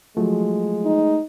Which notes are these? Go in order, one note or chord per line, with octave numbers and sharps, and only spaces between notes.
F3 F#3 G#3 A3
D#4